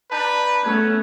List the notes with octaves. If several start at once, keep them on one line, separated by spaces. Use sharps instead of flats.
D4 B4 A5 A#5 G6
A3 B3 C#4 F#6 G#6